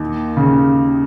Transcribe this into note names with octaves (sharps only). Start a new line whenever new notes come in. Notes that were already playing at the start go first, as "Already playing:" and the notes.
Already playing: D#2 D#3
C#3